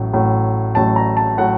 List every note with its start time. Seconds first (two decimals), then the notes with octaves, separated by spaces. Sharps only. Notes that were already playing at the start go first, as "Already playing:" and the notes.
Already playing: A1 A2 F#3
0.13 A1 A2 F#3
0.75 A1 A2 F#3 A5
0.96 A#5
1.17 A5
1.38 A2 F#3 F#5